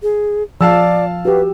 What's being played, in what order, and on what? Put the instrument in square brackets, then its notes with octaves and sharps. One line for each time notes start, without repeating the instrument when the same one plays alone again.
[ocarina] G#4
[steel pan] F3 [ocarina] D5 [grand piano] F5 A5 E6
[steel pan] F#4 G4 [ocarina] B4